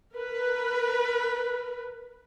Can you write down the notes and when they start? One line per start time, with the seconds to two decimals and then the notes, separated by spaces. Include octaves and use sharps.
0.14 A#4 B4